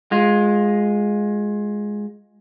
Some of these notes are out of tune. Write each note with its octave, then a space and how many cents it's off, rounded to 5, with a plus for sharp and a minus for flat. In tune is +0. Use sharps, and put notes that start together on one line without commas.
G#3 +0 F4 +25